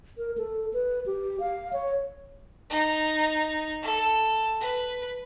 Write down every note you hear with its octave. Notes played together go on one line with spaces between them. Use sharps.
A#4
A4
B4
G4
F5
C#5
D#4
A4
B4